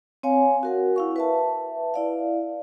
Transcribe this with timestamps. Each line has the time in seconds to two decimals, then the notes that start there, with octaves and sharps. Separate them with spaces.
0.23 C4 C#5 F5 G#5
0.63 F#4 A#4 F#5
0.96 E4 F5 C#6
1.16 B4 E5 A5
1.94 E4 D5 F5